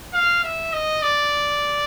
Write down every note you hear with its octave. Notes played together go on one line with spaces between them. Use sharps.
F5
E5
D#5
D5